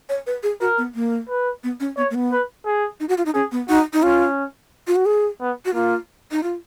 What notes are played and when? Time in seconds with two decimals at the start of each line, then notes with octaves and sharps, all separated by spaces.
0.09 C#5
0.27 B4
0.43 G#4
0.61 F#4 A#4
0.78 B3
0.95 A#3
1.29 B4
1.64 B3
1.80 C#4
1.97 B3 C#5
2.10 A#3
2.15 B3
2.31 B4
2.66 G#4
3.00 D#4
3.09 F#4
3.18 F4
3.26 D#4
3.34 C#4 G#4
3.52 B3
3.69 D#4 F#4
3.93 D#4
4.03 C#4 F4
4.87 F4
4.96 F#4
5.06 G#4
5.40 B3
5.65 F#4
5.74 A#3 F4
6.31 D#4
6.43 F4